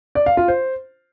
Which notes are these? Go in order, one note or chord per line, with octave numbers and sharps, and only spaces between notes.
D5
F5
F4
C5